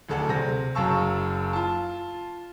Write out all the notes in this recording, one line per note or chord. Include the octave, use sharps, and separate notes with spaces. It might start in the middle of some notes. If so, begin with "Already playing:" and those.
D1 D2 G#4 A4 D5 F#5
C3 A#6
F#1 F#2 F5 A5 C#6 E6
F4 A5